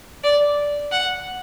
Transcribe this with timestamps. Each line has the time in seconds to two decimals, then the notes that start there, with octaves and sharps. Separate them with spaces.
0.24 D5
0.92 F#5